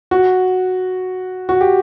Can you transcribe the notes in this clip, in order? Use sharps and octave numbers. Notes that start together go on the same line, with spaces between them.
F#4
F#4
G4